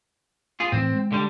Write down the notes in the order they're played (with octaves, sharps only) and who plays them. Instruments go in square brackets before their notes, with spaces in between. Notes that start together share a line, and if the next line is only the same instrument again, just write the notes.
[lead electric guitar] F4 G#4
[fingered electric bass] A2 E3 [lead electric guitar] C4
[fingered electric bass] G#3
[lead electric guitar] D3 G3